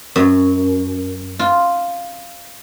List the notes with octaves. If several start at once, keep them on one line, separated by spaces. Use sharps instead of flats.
F#2
F4